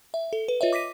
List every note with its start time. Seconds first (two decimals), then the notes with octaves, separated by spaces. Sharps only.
0.14 E5
0.33 A4
0.48 B4
0.61 F4 B4 C#5 D#5 E5
0.73 D6 A#6 B6 D#7